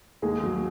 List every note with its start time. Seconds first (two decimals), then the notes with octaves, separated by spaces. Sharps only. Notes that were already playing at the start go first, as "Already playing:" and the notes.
0.22 D#2 G#3 G#4
0.43 F#3